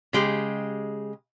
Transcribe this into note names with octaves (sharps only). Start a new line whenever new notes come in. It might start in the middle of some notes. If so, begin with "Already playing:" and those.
C#3 G#3 G4